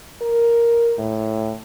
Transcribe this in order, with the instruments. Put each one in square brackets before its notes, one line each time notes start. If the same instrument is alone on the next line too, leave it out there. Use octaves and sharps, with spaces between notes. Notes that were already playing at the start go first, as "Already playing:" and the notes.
[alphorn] A#4
A2